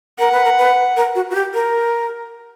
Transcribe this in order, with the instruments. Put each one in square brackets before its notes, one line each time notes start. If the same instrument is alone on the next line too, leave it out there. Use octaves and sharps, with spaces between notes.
[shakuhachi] A#4 [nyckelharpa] F#5
[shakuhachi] B4
A#4
B4
A#4
F#4
F#4
G4
A#4